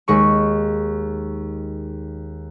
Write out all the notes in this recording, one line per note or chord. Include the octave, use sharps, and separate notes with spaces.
D#2 G#3 C#6